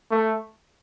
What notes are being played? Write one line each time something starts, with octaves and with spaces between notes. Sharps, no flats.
A3